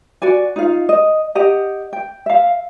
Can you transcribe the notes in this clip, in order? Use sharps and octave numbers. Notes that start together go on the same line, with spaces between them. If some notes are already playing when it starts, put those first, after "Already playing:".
F#4 D5 G#5
D#4 F4 F5
D#5
G4 D#5 F#5
G5
E5 F5